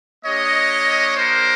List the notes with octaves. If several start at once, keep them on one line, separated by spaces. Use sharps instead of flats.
A#3 D4 G4 C#5 D#5
A#4 C5